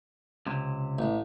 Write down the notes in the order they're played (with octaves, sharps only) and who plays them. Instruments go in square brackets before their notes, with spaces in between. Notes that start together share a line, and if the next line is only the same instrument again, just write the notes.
[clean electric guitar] C#2 C3
[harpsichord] A1